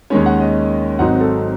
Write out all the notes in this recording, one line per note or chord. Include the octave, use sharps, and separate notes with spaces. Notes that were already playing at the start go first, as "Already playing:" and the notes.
D#2 D#3 G#3 C#4 C#5
F#5
D#5
G#1 G#2 F#3 C4 D#4 F#5
A4